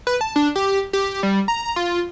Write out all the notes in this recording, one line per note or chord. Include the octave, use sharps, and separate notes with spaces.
B4
A5
D4
G4
G4
G3
A#5
F4